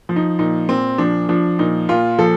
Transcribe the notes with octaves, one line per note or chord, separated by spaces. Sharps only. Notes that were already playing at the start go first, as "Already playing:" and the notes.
F3
D#4
A#2 D#4
A#2 C4
F3 D4
F3 D4
A#2 D#4
A#2 F4
F3 A4